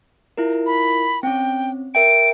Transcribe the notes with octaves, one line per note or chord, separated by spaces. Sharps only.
E4 F4 A#4
B5
C4 C#4 G5
A#4 E5 G5 D7